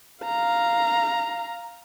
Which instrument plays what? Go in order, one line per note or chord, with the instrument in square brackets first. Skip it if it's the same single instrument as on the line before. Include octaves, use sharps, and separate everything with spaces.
[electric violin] F5 A#5